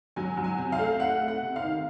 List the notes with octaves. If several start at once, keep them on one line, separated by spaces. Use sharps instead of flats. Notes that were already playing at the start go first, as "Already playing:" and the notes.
F#3 G#5
F#3
G#5
C3
F5
A3
A3 F#5
A3
F#5
C3
F5
D#3